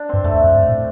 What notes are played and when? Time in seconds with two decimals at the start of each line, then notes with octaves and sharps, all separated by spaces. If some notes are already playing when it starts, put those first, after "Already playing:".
Already playing: D4
0.09 G2 C4
0.24 F2 A3
0.33 E2
0.44 F2
0.55 G2
0.69 A2